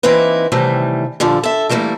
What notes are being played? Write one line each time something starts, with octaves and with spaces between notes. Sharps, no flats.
E3 A#3 C4 D#4 E4 B4
A2 C3 D#3 E3 G3 A3
A#2 D3 F3 G3
A4 E5
E3 G3 A3 A#3 E4